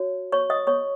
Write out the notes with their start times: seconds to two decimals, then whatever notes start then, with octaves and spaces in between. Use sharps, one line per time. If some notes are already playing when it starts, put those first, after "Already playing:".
Already playing: F#4 C#5
0.32 C#5 C#6
0.50 D#5 D#6
0.67 C#5 C#6